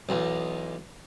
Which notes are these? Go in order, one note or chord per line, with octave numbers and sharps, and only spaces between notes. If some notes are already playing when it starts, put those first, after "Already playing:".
B1 E2